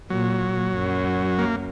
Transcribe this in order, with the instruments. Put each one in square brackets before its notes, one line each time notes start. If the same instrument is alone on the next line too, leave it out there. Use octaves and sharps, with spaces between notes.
[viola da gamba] A#2 [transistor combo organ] F#3
[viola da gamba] F#2
[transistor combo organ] A#3